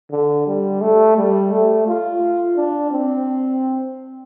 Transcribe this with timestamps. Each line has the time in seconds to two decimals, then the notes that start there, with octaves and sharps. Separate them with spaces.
0.11 D3
0.47 G3
0.82 A3
1.17 G3
1.52 A3
1.87 F4
2.56 D4
2.91 C4